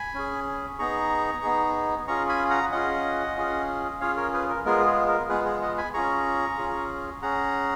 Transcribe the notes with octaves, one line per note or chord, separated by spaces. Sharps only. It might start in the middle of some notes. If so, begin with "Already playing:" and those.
Already playing: G#5 B5
C#4 G#4
B3 D#4 G#4 A#5 C#6
B3 D#4 G#4
C#4 F4 G#4 A#5 C#6
G#5 B5
F#5 A#5
C#4 F4 G#4 D#5 F#5
C#4 F4 G#4
C#4 F4 G#4 C#5 F5
A#4 C#5
G#4 B4
A#4
G#3 B3 F4 G#4 A#4
G#4
A#4
G#3 B3 F4 G#4 B4
G#4
D#5 F#5
G#5 B5
C#4 F4 G#4 A#5 C#6
C#4 F4 G#4
C#4 G#4 F#5 A#5